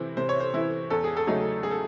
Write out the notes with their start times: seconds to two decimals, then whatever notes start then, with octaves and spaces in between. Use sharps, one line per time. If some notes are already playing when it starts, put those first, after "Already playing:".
Already playing: C3 E3 C4 E4
0.17 C3 C5
0.29 C#5
0.40 C5
0.54 E3 C4 E4
0.90 E2 A4
1.04 G#4
1.17 A4
1.27 C#3 F#3 A3 D#4
1.63 G#4
1.71 A4